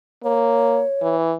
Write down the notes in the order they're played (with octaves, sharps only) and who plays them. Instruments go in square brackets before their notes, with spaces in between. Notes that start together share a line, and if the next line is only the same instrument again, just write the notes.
[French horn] A#3 [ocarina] C#5
[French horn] E3